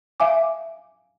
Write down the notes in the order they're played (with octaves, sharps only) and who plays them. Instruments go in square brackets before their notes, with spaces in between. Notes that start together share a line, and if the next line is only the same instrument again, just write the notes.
[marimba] E5 F5 G#5 D6